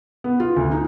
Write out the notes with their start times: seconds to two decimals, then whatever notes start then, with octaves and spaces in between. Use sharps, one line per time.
0.24 B3
0.40 F4
0.56 D2
0.72 D#4